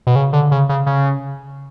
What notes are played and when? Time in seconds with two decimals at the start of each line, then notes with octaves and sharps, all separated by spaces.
0.07 B2
0.16 C#3
0.33 D3
0.51 C#3
0.69 C#3
0.86 C#3